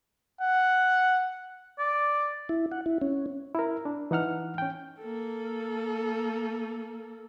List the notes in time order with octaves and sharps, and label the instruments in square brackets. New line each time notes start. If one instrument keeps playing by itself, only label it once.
[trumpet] F#5
[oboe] D5
[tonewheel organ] E4
F#5
E4
C#4
[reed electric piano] E4 A#4
D4
E3 D#4 F#5 F6
C#4 G5
[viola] A#3 A4